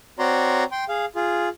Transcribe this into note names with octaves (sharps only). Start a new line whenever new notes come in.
C4 F#4 C#5 D5 A#5 C6
G5 C6
G#4 F5
F4 G#4